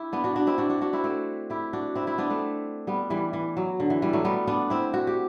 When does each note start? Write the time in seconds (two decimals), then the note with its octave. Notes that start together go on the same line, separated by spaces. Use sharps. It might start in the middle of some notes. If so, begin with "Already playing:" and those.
Already playing: E4 G4
0.13 B3 D4
0.24 D4 F#4
0.36 D4 F#4
0.47 C4 E4
0.58 D4 F#4
0.70 D4 F#4
0.81 D4 F#4
0.93 C4 E4
1.04 A3 C4
1.50 E4 G4
1.73 D4 F#4
1.95 C4 E4
2.07 C4 E4
2.18 B3 D4
2.30 A3 C4
2.87 G3 B3
3.10 E3 G3
3.33 E3
3.57 F#3
3.80 D3
3.90 E3
4.02 E3 G3
4.13 F#3 A3
4.25 G3 B3
4.47 B3 D4
4.70 C4 E4
4.94 F#4
5.07 G4